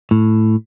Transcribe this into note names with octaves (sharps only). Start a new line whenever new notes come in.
A2